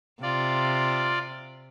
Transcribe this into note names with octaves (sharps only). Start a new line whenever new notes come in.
C3 F4 D5